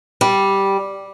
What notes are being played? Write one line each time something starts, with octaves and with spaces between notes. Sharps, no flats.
G3